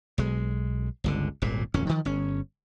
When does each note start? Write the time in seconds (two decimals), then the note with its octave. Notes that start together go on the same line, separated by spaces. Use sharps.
0.18 B1 G#3
1.04 G1 C#2 D3
1.42 D#1 G#1 A#2
1.74 D1 F2 C#4
1.87 D#3 F3
2.05 G1 C#4